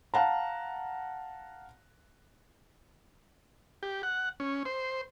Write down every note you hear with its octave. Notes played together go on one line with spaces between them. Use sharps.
F5 F#5 A5 A#5
G4
F#5
C#4
C5